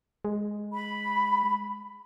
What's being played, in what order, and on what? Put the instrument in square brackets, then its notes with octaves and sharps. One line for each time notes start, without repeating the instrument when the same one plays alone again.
[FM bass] G#3
[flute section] B5